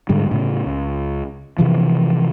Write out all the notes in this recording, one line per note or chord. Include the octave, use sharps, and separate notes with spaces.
G#2 D3 G3
A2 C#3
C#2
C3 E3 F3